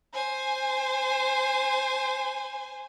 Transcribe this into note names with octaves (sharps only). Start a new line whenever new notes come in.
C5 G#5